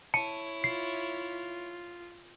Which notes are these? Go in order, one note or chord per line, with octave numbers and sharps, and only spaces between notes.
E4 C#5 A5 C#7
F4 C7